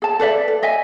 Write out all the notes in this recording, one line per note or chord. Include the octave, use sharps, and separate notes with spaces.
G#4 A5
A4 B4 D5 E5
A4
D#5 E5 G#5